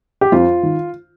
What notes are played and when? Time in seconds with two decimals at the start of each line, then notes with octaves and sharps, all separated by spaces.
0.21 G4
0.32 F2 F4
0.63 D#3